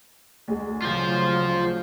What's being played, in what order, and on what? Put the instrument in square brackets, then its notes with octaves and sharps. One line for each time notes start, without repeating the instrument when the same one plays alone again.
[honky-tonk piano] D2 G#3
[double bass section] C#3 F3 F#3 [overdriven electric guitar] F4 C5